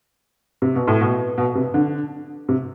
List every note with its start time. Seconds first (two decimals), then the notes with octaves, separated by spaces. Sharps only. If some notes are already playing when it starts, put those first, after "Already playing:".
0.62 C3
0.75 B2
0.87 A2
1.01 B2
1.38 B2
1.55 C3
1.74 D3
2.49 C3